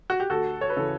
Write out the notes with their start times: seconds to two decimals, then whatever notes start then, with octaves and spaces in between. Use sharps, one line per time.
0.10 F#4
0.20 G4
0.30 D2 F#4 A4
0.61 C#5
0.70 B4
0.76 C#3 E3 A4